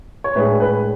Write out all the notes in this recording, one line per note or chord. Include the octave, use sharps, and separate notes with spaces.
C#5
A2 G#3 D4 B4
B4